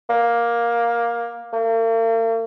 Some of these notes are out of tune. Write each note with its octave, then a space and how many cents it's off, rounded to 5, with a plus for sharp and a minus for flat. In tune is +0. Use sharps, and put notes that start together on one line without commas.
A#3 +10
A#3 -45